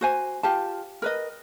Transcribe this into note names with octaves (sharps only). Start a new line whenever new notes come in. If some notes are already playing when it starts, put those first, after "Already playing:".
F#4 C5 G#5
F4 G4 A5
A#4 B4 D#5